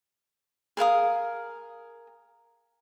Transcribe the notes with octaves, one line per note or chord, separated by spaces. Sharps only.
G#4 A#4 F5 D#6